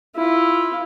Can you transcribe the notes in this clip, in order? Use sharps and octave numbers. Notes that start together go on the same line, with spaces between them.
E4 F4